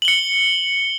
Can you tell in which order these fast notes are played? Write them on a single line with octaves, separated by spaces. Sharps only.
F#7 G7 C#7